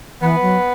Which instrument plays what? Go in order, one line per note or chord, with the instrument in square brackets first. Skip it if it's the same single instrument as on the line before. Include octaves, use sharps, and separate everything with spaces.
[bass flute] E3 [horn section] B3 B4
[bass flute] F#3